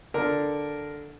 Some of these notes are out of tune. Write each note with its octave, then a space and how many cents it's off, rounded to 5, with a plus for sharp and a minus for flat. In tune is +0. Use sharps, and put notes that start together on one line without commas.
D3 +0 D4 +0 A#4 +0